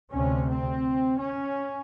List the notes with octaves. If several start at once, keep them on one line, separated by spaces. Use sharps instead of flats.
D2 C3 C#4
C4
C#4